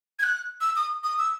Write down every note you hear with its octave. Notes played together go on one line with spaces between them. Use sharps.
G#6
F#6
E6
D#6
D#6
E6